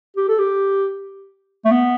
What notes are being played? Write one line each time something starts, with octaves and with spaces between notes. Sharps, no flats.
G4
A4
G4
A3
B3